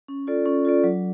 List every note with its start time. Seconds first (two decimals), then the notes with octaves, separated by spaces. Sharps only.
0.08 C#4
0.27 F4 A4 D5
0.46 C#4
0.65 F4 A4 D5
0.84 F#3